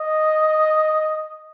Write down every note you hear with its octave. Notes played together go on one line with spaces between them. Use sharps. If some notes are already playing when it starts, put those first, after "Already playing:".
Already playing: D#5